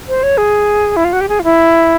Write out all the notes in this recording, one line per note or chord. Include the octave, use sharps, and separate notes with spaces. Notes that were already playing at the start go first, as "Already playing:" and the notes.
C5
C#5
G#4
E4
F4
F#4
G4
G#4
F4
E4